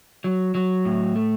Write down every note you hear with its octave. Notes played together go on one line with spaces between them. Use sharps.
F#3
F#3
A2
A3